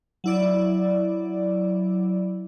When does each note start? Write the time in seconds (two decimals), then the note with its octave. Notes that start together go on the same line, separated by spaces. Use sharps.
0.24 F#3 E4 D5